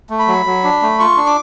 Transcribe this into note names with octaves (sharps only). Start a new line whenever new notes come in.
A3
B5
F#3
F#3
D4
A3
F4 C#6
D4
D6